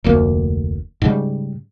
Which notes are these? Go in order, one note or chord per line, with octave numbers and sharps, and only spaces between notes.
F1 D2 A#3
G#2 C#3 G3